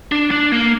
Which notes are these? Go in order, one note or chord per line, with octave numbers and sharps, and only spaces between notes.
D4
D4
A#3